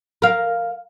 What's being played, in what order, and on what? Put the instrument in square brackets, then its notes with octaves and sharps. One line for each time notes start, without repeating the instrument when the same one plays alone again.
[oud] A#4 F5